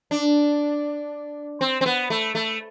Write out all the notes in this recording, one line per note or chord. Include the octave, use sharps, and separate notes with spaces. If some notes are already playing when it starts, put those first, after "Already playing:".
D4
C4
C4
B3
A3
A3